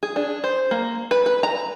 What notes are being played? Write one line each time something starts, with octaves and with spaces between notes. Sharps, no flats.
G#4
D4
C5
A#3
B4
B4
A#5